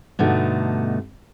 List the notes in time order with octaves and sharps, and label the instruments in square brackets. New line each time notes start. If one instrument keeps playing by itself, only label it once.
[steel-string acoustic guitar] G2 B2 D3 A3 D#4